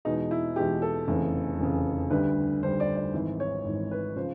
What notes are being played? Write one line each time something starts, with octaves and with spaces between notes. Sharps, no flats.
E2 B2 G#3 D#4
E4
E2 B2 G#3 G4
A4
F1 E2 C#3
F1 E2 C#3
D2 D3 G3 B4
D2 D3 G3 C5
D5
D5
G#1 G#2 E3
C#5
G#1 G#2 E3
B4
C#3 F3 C5